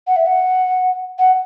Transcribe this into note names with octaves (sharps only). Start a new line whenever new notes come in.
F#5
E5
F#5
F#5